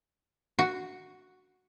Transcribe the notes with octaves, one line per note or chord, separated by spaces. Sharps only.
F#4